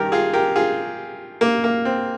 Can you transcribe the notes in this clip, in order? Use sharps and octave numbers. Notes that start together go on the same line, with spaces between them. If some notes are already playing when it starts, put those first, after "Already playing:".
Already playing: G2 D#3 G4 A#4
F4 G#4
G4 A#4
F4 G#4
A#3
A#3
C4